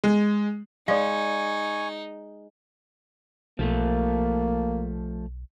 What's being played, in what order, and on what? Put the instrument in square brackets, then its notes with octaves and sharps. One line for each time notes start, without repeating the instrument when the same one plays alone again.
[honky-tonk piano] G#3
[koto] G#3 [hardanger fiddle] D#4 [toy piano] D5 F5 [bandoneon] G#5 C#6
[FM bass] B1 [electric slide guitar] F3 A3 [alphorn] A#3